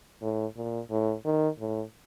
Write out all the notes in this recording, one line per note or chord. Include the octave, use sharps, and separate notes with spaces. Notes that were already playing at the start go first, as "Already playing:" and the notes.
A2
A#2
A2
D#3
A2